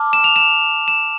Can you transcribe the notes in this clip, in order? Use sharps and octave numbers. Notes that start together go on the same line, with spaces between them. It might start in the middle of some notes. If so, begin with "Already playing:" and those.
Already playing: A5 D6 F6
E7
F7
E7
E7